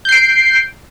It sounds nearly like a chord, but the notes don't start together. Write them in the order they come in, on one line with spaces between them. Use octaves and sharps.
G6 C7 D7